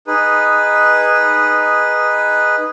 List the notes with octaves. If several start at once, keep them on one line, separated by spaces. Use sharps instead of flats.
D#4 G#4 B4